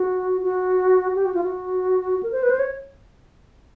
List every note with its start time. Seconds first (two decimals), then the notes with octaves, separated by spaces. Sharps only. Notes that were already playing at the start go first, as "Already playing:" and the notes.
Already playing: F#4
0.43 F#4
1.15 G4
1.25 F#4
1.35 F4
1.44 F#4
2.23 A#4
2.32 C5
2.43 B4
2.50 C5
2.59 C#5